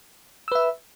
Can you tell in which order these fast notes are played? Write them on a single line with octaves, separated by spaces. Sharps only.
E6 B4 E5